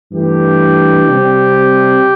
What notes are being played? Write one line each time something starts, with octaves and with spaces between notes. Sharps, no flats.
G2 E3 A3 D4 G4
C3 G3 C4